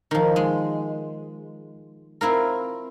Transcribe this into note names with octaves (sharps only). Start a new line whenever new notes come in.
D#3 F3
G#3
C4 E4 F4 A#4